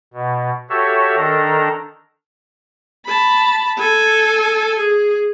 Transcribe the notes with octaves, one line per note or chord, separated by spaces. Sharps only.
B2
F#4 G4 A4 C#5 E5
D#3 D4 A4 A#5
A5 B5
A4 G#5
G#4